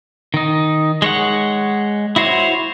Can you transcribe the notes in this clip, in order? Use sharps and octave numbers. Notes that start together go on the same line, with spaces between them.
D#3 D#4
G#3 C#5 F#5
E4 F#4 C5 C#5